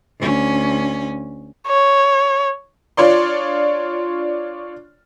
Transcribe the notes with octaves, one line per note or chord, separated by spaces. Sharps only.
D2 C#4
C#5
D4 F4 C#5 D5 C6